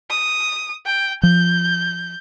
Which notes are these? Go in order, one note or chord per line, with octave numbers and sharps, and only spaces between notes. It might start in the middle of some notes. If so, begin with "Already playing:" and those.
D#6
G5
F3 G6